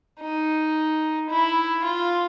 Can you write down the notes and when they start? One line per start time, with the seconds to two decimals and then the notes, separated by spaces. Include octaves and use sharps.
0.20 D#4
1.30 E4
1.84 F4